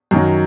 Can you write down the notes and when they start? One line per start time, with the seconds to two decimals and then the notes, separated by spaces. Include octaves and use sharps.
0.11 F#2 D#3 F#3